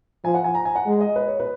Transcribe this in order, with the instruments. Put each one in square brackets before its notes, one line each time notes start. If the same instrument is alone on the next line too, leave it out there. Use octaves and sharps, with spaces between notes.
[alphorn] F3 [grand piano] G#5
[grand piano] F#5
G#5
A#5
G#5
F#5
[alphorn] G#3
[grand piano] D#5
B4
C#5
B4